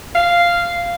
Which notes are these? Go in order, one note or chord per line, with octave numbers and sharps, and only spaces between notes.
F5